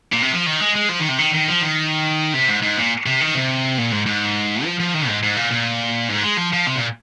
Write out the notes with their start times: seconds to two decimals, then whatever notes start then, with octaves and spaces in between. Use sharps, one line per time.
0.12 A#2
0.22 C3
0.32 F3
0.46 D#3
0.61 G#3
0.75 G#3
0.89 F3
1.00 D#3
1.08 C3
1.18 D#3
1.33 D#3
1.47 F3
1.61 D#3
2.34 C3
2.49 G#2
2.63 G#2
2.77 A#2
3.06 C3
3.21 D#3
3.35 C3
3.78 A#2
3.92 G#2
4.06 G#2
4.64 F3
4.80 F3
4.94 D#3
5.08 G#2
5.23 G#2
5.36 A#2
5.51 A#2
6.09 G#2
6.24 G#3
6.37 F3
6.53 F3
6.66 C3
6.76 A#2